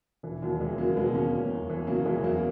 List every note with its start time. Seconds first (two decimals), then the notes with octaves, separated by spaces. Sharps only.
0.23 E1 E3
0.42 D#2 F#3
0.60 E3 G#3
0.78 C#3 F#3 A#3
0.96 E1 G#3 B3
1.14 D#2 A#3 C#4
1.33 F#1
1.51 E2
1.70 E3
1.87 C#3 F#3 A#3
2.05 F#1 E3 G#3
2.23 E2 F#3 A#3